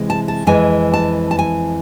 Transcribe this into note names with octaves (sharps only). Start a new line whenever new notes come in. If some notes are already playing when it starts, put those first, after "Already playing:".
Already playing: C3 E3 G#3
A5
A5
F2 E3 G#3 G#5
A5
A5
G#5